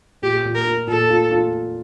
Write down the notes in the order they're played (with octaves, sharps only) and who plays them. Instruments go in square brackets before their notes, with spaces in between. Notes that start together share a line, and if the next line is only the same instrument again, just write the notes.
[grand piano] A#2 [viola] G4
[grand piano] A#2
[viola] A#4
[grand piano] F4
[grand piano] A#2 [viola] A4
[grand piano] F4
F4